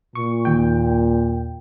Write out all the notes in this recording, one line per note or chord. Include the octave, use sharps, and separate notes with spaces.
A#2 C#6
D#2 G5